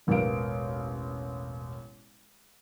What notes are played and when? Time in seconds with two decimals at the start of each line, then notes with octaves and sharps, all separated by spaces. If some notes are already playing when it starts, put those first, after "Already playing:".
0.07 E1 A1 A#4 B4 F5 D7